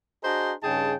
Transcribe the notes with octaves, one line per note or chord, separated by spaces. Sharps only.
D4 F#4 G#4 C5 D#5 A#5
G2 C#3 D#4 G#4 G5 A5